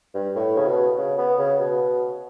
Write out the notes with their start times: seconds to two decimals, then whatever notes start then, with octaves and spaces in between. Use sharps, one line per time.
0.14 G2
0.36 A2
0.57 C#3
0.66 B2
0.97 C#3
1.18 B3
1.39 C#3
1.59 B2